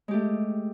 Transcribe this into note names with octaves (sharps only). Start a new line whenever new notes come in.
G#3 A3 G4